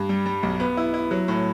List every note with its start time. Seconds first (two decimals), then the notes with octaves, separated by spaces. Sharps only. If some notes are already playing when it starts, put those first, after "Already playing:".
Already playing: G2
0.09 G3
0.26 G3
0.43 B1
0.60 B3
0.77 E4
0.94 E4
1.11 F#3
1.28 A2